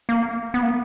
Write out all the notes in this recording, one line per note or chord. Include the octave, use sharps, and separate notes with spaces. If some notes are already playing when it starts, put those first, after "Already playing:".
A#3
B3
A#3